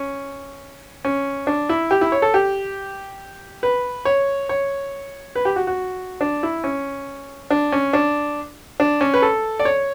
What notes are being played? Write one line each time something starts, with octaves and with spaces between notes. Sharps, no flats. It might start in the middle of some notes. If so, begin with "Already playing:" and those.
Already playing: C#4
C#4
D4
E4
G4
E4
C#5
A4
G4
B4
C#5
C#5
B4
G4
F#4
F#4
D4
E4
C#4
D4
C#4
D4
D4
C#4
B4
A4
D5
C#5